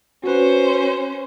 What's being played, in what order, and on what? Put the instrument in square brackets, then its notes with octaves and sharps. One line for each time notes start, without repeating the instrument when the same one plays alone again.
[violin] C#4 C5 [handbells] F#4 B4